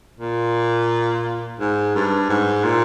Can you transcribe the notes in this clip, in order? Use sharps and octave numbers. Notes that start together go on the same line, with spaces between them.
A#2
G#2
G2
G#2
A#2